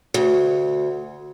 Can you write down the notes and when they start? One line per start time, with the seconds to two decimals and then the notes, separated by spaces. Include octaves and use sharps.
0.14 D2